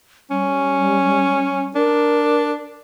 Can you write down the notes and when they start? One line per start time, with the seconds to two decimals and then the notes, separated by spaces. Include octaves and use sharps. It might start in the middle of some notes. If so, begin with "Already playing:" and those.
0.31 G3 C#4
1.75 D4 A#4